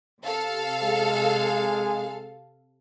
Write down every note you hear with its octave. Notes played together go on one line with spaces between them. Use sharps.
C3 A4 F5
G#3